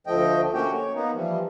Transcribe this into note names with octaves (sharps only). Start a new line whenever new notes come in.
D2 F3 A3 D#5 G5
A3 A#3 C#4 F#4 G4 G5
C#5
A#3 B3 D#4
E3 F3 G3